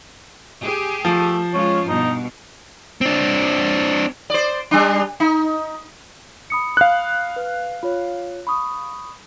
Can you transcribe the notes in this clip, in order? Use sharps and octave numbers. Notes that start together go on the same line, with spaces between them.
G4 G#4
F3 A3
G#3 C#4 F4 C#5
G2 B2 D#4
C4 D4
C5 D5
G3 D4
D#4
B5 D#6 C#7
F5 F#6
B4
F4 C#5
B5 C#6 D#6